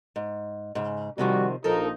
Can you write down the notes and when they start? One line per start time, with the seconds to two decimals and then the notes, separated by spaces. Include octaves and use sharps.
0.16 G#2
0.75 G#2 C#3
1.18 C3 D#3 F3 G3 F#4
1.64 A#1 F3 D#4 A4 A#4